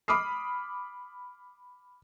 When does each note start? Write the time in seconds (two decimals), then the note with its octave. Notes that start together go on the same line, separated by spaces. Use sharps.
0.08 B5 D6 D#6 F6 C7